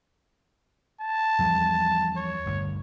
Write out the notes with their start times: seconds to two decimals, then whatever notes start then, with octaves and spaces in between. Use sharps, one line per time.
1.01 A5
1.39 E2 F3 G3
2.17 C#5
2.46 G1 D2